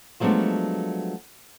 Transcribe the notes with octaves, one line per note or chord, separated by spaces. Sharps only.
F3 F#3 G#3 A3 B3 D4